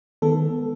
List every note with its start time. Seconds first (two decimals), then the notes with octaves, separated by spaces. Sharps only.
0.22 D#3 G#3 B3 A4